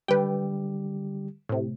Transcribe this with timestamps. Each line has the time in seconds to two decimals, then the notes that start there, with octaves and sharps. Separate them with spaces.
0.08 D3 G3 G4 B4 G5
1.49 A2 C3